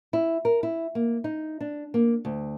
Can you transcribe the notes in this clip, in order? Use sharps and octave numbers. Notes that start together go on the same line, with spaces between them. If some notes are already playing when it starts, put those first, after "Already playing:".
E4
A#4
E4
A#3
D#4
D4
A#3
D2